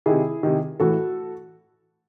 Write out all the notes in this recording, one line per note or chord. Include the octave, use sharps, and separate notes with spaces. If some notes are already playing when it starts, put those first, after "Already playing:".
C3 D#3 E4 G#4
C3 D#3
A2 E3 F#4 A4